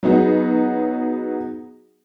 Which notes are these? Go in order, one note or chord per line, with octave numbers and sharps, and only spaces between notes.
F#3 B3 D#4 F#4 G#4